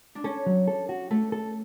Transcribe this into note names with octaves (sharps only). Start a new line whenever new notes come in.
D4
C#4 A4
F#3
A4
F#4
A3 A4
A4